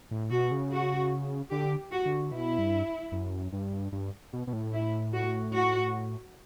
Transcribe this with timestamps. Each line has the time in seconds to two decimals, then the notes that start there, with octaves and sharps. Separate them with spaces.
0.11 A2
0.30 B2 F#4
0.51 C#3
0.71 F#4
1.51 D3 G4
1.91 F#4
2.06 D3
2.32 B2 E4
2.58 G2
3.12 F#2
3.52 G2
3.92 G2
4.33 B2
4.47 B2
4.53 A2
4.73 E4
5.13 F#4
5.53 F#4